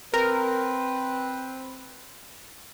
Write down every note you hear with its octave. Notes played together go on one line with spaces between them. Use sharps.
C4 A#4 B4